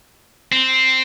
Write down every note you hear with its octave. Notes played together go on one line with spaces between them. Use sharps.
C4